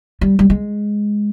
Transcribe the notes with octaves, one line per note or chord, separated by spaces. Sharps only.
G3
G3
G#3